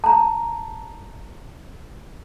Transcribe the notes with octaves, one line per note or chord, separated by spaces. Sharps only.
A5 A#5